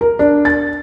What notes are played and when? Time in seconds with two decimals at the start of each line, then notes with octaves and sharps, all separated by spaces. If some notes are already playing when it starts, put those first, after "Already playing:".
0.01 A#4
0.19 D4
0.45 A6